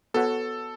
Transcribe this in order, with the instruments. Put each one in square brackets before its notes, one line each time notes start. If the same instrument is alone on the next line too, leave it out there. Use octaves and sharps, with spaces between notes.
[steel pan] B3 F#4 C#5 F#5 [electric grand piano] A4